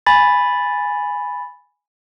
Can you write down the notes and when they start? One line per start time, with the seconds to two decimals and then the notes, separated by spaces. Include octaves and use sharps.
0.06 G#5 B5 A6